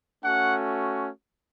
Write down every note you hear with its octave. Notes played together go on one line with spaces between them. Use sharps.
A3 C#4 F#4 F#5